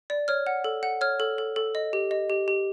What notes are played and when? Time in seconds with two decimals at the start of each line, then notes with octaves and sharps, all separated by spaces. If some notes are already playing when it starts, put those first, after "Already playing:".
0.10 D5
0.28 C#5 F6
0.47 F#5
0.64 A4
0.83 F#5
1.01 C#5 F6
1.20 A4
1.38 A4
1.56 A4
1.75 D#5
1.93 G4
2.11 D#5
2.30 G4
2.48 G4